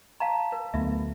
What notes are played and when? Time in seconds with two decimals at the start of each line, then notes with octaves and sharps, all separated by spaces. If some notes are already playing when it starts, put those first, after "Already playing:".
0.20 F5 A5 A#5
0.52 A#4
0.74 D2 F#3 A3 B3 F4 E5